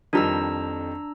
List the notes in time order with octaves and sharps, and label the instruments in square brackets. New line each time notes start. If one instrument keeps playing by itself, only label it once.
[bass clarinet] F2 [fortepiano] D#3 F3 G3 [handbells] D4 A#5 E6